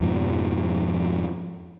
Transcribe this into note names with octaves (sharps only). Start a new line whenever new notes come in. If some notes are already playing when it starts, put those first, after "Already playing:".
F2 G#2 B2 F3